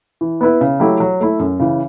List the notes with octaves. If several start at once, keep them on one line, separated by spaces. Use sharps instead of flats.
E3
B3 E4 B4
C#3
F#3 A3 E4 G4
F#3
A3 E4
F#2
C#3 E3